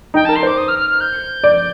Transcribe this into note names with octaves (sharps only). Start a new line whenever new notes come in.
D#4 G5
A#4 A5
C6
C5 D6
D#6
F6
F6
F6
G6
D5